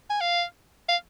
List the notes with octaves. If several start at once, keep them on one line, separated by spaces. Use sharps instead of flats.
G#5
F5
F5